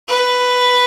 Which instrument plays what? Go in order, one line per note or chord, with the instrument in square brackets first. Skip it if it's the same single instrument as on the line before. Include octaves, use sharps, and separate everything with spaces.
[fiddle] B4